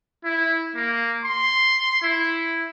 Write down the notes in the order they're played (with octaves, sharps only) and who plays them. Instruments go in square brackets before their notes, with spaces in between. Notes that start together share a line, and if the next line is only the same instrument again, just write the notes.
[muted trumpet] E4
A#3
C6
E4